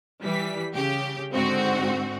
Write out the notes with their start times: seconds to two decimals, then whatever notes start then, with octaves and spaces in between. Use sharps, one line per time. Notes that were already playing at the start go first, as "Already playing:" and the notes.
0.23 E3 G3 B6
0.75 C#3 G4
1.33 G#2 D3 C4 F#4